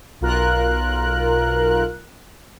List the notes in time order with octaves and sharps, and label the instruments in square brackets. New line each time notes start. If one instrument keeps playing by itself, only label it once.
[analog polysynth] B1 F4 A#4 F#6